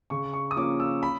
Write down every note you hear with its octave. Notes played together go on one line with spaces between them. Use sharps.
C#3 C#6
C#6
D#6
F3 A#3 C#4 F4 D6
E6
B5